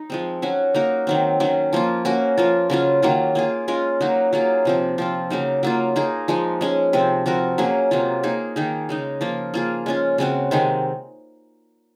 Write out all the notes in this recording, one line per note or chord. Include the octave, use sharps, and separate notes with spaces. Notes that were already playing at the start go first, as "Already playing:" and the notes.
Already playing: D#4
F3 G#3 C4
F#3 C#4 F#4
A#3 D#4 F#4 A#4
D#3 F#3 C4
D#3 F#3 C#4
F3 A#3 F4
A#3 C#4 F#4 A#4
F3 A#3 F4
C#3 F#3 C#4 F4
D#3 F#3 A#3 F4
A#3 F4 G#4
G#3 C#4 F4 A#4
F#3 A#3 D#4 F#4
F#3 A#3 F4 G#4
C3 F3 C4
F3 C4 F4
C#3 F#3 A#3 D#4
F#3 A#3 F4
A#3 D#4 G#4
F3 G#3 D#4
G#3 C#4 G#4
C3 F3 C4
F3 C4 F#4 A#4
F#3 A#3 C#4 G#4
C3 F#3 A#3 F4
A#3 D#4 G#4
D#3 A#3 D#4 G#4
C#3 G#3 D#4
F3 A#3 F4
A#3 F4 G#4
G#3 C#4 F4
C#3 G#3 C4 F#4
C3 D#3 G#3